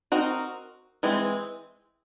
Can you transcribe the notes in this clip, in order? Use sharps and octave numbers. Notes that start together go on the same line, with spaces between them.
C4 D#4 F#4 A#4
E3 G#3 C4